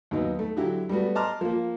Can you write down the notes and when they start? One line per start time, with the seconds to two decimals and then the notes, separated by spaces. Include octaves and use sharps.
0.11 D#2 F#3 B3 D#4
0.39 A3
0.57 D3 F#3 E4 G4
0.89 G3 A3 B3 F#4
1.15 D#5 A5 A#5 C6 D6 F6
1.41 F3 A#3